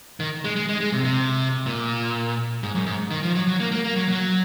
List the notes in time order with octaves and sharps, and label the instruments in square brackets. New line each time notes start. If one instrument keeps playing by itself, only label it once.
[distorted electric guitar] D#3
G#3
G#3
G#3
G#3
C3
C3
A#2
G#2
F#2
G#2
D#3
F3
F#3
F#3
A#3
A#3
A#3
F#3
F#3